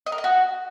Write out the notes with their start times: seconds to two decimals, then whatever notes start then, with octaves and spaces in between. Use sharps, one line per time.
0.06 D#5
0.12 A#4
0.18 D#5
0.24 F#4